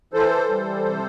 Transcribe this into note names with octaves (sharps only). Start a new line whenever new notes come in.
E3 A4 C5
G3
C3